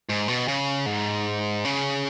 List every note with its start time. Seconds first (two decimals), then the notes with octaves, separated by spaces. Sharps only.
0.09 G#2
0.28 B2
0.48 C#3
0.86 G#2
1.65 C#3